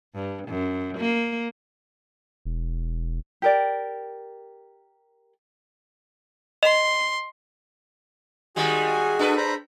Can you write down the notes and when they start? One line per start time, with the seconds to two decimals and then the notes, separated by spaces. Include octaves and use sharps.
0.15 G2
0.48 F#2
0.98 A#3
2.45 E1
3.42 G4 A#4 D5
6.63 D#5 C6 E7 F7
8.56 D#3 G3 G#3 F#4 G#4 G#5
9.19 D4 A4 B4
9.37 C5 A#5 B5